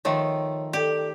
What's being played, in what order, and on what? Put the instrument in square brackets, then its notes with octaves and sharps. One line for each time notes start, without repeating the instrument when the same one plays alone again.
[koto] D#3 F3 A3 [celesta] C#5
[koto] G4 [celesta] A4 D5